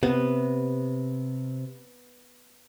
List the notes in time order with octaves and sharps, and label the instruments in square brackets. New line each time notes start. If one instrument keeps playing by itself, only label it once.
[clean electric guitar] C3 [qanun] B3